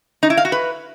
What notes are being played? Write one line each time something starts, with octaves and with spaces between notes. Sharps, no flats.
D#4
E4
F5
F#4
B4